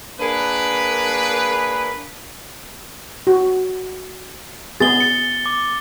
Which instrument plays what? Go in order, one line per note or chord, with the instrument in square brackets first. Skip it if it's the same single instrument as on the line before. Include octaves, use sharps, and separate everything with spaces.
[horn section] A#3 D4 G#4 A#4 B4
[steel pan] F#4
[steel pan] B3 G#4 [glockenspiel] A6 G7
[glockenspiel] A6 C#7
D6